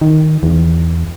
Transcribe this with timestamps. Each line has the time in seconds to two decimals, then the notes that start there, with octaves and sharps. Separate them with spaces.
0.01 D#3
0.43 E2